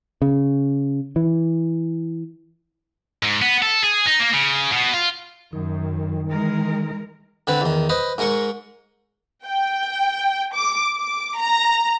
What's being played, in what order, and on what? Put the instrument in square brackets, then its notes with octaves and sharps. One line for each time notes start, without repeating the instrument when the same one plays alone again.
[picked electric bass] C#3
E3
[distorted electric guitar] G#2
B3
A4
G#4
D#4
A#3
C#3
B2
F4
[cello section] F#2 [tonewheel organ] D#3
[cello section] E3 G#3 A#4
[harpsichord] D3 C4 B4
E2 D#3
B4 C5 D#5
G#2 G#3 A#4 C6 C#6
[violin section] G5
D6
D6
A#5